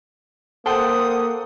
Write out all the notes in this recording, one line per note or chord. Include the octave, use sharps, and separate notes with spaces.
A#3 A4 C5 F#5 G5 D#6